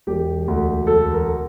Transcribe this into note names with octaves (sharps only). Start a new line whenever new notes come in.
E1 G4
D2
E1 A4
A#4